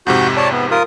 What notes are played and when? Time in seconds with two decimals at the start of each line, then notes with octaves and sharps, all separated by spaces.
0.07 F2 G#2 C3 F#4 G6
0.37 C#5 D5 A5
0.52 B3
0.71 F4 A#4 D#6